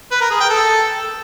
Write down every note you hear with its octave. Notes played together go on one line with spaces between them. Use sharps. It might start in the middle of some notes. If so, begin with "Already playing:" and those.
B4
A#4
G#4
G5
A4